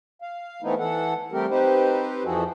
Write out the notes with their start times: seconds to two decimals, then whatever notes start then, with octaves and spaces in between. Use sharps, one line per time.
0.22 F5
0.63 E3 A3 B3 C4 D#4 E4
0.79 E3 A4 F#5
1.32 G3 A3 C4 G4 A#4
1.50 C4 D#4 G4 B4 C5
2.25 F2 E3 F3 F#4 G#4 A4